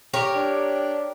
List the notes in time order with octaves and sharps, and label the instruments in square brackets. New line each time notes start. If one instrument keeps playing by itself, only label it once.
[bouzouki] G4 A#4 C#5
[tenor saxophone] D4